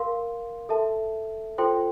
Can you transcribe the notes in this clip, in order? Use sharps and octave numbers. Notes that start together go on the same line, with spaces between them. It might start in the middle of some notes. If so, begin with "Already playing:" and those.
Already playing: A#4 F5 C6
A4 E5 A5
F4 A4 C5 G5 C6